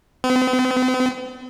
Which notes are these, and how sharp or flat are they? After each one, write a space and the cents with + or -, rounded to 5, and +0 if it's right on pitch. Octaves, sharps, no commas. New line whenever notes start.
C4 -45